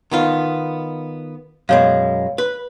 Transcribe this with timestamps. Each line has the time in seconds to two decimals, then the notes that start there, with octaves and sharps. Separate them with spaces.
0.11 D#3 B3 F4
1.69 F#2 B2 G#3 C#5 F5
2.38 B4